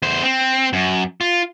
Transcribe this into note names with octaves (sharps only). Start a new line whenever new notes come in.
E2 C5
C4
F#2
F4